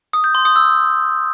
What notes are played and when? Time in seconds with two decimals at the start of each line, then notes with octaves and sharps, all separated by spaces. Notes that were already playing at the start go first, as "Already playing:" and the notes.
0.13 D#6
0.24 G6
0.35 C6
0.45 D#6
0.56 E6